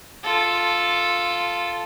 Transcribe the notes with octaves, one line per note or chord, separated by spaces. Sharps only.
F4 A4